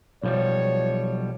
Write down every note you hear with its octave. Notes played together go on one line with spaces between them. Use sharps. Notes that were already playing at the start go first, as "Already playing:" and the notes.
B1 F3 G3 C#5